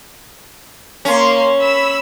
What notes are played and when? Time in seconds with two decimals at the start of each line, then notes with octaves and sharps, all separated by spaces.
1.05 A#3 C#4 C6
1.62 B5 E6